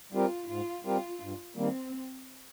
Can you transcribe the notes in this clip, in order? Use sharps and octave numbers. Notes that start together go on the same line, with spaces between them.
G3 C4 F4 G4 A#4
G#2 F4
G3 C4 F4 G4 A#4
G2
D#3 G3 A#3 C4